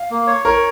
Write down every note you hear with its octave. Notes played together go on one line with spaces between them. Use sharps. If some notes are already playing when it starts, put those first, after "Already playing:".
Already playing: F5
A#3
C#5
A#4 C#5